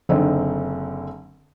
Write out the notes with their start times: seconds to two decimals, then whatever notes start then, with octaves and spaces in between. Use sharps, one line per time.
0.09 F#1 D3 C4 D#4